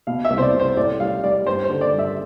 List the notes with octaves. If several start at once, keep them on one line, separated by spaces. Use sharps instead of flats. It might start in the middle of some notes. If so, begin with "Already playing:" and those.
B2 F5
E5
C2
C5
D5
C2
C5
A2 D5
G3 F5
G3 D5
G2 C5
C5
D3
D5
G2
E5